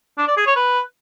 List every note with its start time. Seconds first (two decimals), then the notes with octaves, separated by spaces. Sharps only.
0.18 D4
0.28 D5
0.37 G#4
0.47 C#5
0.56 B4